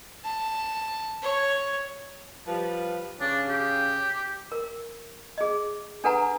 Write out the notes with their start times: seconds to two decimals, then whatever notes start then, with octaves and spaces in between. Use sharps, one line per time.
0.24 A5
1.22 C#5
2.47 F3 G3 B4
3.20 C#3 D4
3.49 G4
4.52 A#4
5.38 G#4 D#5
6.04 D4 A4 B4 F#5 G#5 A#5